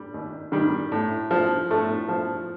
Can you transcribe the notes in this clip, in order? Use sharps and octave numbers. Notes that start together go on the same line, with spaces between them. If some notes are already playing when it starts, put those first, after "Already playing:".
Already playing: G3
D#2
D#3 G3
A2
F3
A2 A3
F3